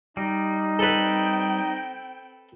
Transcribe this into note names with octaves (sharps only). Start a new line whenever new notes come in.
G3 D#4 D#5
C4 A4 B4 G5